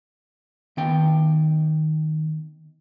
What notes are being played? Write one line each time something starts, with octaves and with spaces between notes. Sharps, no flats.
D#3 B3 G5